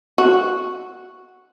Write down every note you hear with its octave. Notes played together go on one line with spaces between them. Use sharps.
F#4